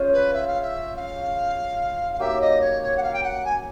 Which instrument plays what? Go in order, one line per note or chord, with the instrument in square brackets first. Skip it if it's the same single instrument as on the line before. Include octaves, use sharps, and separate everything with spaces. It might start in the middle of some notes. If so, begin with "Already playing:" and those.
Already playing: [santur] C#4 F4 G#4 C5
[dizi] B4
E5
F5
E5
F5
F5
[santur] F#3 A#3 D#4 G4 [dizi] E5
[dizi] D#5
C#5
C#5
F#5
F5
G5
F#5
G#5